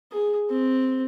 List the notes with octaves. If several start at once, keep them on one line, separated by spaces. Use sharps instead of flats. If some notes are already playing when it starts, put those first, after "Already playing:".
G#4
C4